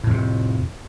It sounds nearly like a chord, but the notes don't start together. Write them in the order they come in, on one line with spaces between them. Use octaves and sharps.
A2 F2 C3